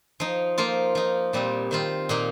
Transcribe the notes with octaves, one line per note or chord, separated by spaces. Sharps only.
F3 D#4
F3 A#3 F4
F3 D#4
A#2 G3 C4 D#4
D#3 C4 F4
A#2 A#3 D#4